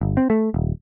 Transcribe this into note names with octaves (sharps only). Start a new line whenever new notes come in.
G1
C4
A3
D#1